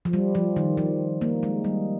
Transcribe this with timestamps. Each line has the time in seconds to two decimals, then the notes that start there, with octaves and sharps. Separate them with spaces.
0.05 F3
0.13 G3
0.35 F3
0.56 D#3
0.78 F3
1.21 A#3
1.43 G#3
1.64 G3